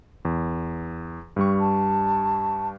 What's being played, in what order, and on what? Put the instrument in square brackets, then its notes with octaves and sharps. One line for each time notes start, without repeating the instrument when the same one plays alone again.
[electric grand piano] E2
G2 G3 C#6
[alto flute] A5